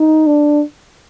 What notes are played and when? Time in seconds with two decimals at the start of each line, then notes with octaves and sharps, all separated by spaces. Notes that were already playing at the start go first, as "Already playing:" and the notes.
Already playing: D#4
0.27 D4